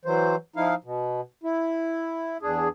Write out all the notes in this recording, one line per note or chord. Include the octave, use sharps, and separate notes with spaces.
E3 F#3 C5
F3 D#4 E4 F5
B2
E4
E2 D4 G#4